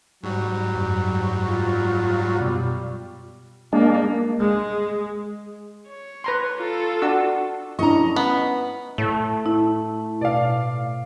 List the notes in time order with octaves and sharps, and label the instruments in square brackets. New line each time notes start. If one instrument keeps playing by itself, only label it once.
[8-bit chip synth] G#2 G3 [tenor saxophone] F#3
[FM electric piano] F#2
[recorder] F4
[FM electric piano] F#2 B2 [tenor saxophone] G3
[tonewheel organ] G#3 D4 [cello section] A#3
[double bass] G#3
[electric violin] C#5
[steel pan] B4 A#5 C6
[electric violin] F4 A4
[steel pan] D4 F#4 E6
[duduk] C#4 [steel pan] D4 E4 C#6 [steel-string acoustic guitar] D#5 A#5
[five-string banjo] B3
[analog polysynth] A2 [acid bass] A3
[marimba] E4
[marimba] B2 [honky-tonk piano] D5 F5